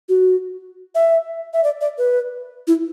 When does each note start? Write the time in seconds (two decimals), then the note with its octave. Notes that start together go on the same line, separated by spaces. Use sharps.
0.09 F#4
0.95 E5
1.53 E5
1.64 D5
1.81 D5
1.98 B4
2.67 E4